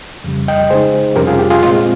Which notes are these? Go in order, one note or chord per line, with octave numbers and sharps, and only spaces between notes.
F2 C#3 G3
D#5 G5
C#3 G#3 D#4 G#4 C5
F2 C3 G3 C#4 G4 A#4
F4 G#4
G4
F4 G#4
A#2 G#3 C4 F4